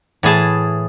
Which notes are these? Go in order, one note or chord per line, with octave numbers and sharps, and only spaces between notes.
A2 E3 G#4 A5